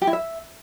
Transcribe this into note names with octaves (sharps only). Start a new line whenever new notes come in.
G4
E4
E5